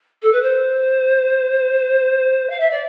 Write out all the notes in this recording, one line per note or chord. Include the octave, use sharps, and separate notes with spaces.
A4
B4
C5
F5
E5
D5